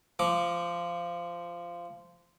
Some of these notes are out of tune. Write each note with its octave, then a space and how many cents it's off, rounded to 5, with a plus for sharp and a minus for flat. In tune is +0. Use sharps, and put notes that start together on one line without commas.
F3 -15 D6 +0